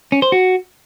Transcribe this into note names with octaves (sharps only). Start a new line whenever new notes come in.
C#4
C5
F#4